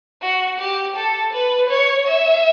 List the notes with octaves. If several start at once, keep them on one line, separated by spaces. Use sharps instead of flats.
F#4
G4
A4
B4
C#5
E5